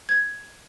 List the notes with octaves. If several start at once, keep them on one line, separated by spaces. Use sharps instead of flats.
G#6